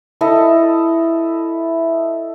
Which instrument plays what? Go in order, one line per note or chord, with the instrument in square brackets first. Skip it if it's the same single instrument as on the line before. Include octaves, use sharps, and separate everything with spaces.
[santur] E4 A4 D#5